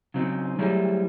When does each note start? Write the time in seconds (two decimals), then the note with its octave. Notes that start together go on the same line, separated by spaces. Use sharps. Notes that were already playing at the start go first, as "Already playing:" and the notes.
0.14 C#3 F#3 C4 D#4
0.59 F#3 G3 A3 E4 G#4 C5